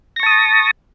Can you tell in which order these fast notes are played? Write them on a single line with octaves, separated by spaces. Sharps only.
A#6 C#6 A5 D#6